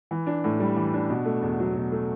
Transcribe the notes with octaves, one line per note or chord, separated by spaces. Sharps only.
E3
D4
A2
G3
E3
D4
B2
A3
E2
F#3
B2
A3